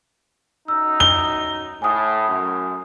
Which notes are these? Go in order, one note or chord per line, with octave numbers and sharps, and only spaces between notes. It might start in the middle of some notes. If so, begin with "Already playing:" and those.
F#2 D#4 E6
G7
A2 G#5 D#6
F#2